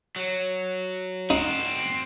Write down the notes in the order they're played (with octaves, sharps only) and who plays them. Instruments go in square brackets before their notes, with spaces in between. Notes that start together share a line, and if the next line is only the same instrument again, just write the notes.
[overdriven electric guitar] F#3
[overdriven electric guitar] C4 F#4 [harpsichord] D#4